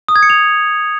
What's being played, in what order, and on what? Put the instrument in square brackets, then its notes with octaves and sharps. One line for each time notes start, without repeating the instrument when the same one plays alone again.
[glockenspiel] D#6
G#6
C#7
F7